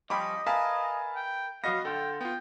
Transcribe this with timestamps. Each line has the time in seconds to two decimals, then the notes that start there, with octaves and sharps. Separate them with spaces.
0.10 F3 G3 C#4 D#5 G5 B5 D6
0.47 A#4 B4 E5 F5 G#5 A5
1.15 G5
1.64 F#3 B3 F#4 D#5 F5 A#6
1.85 D3 F4 A4 G5
2.21 B3 F4 G5